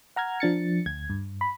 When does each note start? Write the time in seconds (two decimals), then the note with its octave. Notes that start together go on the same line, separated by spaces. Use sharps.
0.16 F#5 A#5 F6 G#6
0.40 F3 D4 A6 C#7
0.86 D2 G#6
1.10 G2
1.41 B5